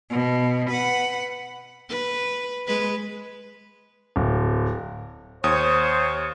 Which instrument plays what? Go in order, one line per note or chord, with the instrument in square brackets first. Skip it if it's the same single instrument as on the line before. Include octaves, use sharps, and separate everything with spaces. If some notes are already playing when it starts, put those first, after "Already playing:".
[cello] B2
B4 F#5
[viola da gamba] B4
G#3 B4
[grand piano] D1
[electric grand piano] D#2 D#6 [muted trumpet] C5 [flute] C#5